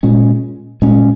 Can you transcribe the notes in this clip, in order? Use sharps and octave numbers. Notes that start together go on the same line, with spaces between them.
A#2 G#3 C#4
A#2 G#3 C#4